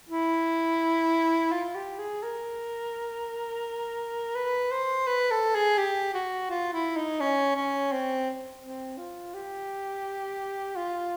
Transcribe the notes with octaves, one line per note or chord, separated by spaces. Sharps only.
E4
F4
G4
G#4
A#4
B4
C5
B4
A4
G#4
G4
F#4
F4
E4
D#4
C#4
C#4
C4
C4
F4
G4
F4